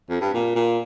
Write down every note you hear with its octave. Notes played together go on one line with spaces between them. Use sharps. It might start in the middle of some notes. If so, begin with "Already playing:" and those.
F2
G2
A#2
A#2